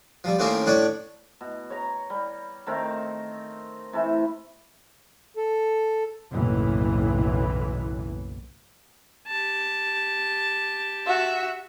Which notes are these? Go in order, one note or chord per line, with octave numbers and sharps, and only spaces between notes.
F3 G3
A2 D#3 A#3 C4 C#4
A2 D4 C#5 B5
B2
C#5 A#5
G3
D#3 A3 C4 A#4
C3 E3 A3
A4
F#1 B1 A2 E3
G4 A5
F#4 E5